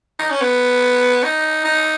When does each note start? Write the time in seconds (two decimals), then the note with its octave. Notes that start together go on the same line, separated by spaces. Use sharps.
0.19 D#4
0.31 C#4
0.41 B3
1.24 D#4
1.65 D#4